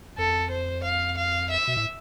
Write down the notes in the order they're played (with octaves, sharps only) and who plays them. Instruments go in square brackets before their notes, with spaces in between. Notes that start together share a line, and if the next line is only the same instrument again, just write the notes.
[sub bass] F2 [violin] A4
[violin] C5
F5
F5
E5
[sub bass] B2
A2